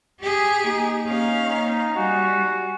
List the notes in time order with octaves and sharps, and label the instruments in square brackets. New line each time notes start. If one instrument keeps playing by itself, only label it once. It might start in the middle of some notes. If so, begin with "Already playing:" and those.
[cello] G4 G#4
[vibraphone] A#3 [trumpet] D#4
[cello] C#4 F5
[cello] G3 [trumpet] F#4 [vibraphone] G#5